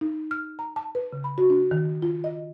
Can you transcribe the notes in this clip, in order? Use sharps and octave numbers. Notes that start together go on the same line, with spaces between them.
D#4
F6
A#5
A5
B4
C#3
B5
F#4
D4
D#3
F4
D#5